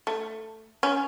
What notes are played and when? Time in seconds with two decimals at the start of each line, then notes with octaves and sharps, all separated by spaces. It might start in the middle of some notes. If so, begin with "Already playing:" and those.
0.07 A3
0.83 C#4